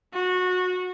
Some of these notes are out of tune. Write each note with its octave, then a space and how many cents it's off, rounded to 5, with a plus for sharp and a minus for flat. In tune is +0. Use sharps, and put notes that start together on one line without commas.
F#4 -20